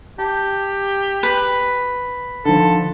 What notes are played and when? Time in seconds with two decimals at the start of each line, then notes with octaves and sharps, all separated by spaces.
0.18 G4 A5
1.23 B4
2.45 D3 D#3 F3 A4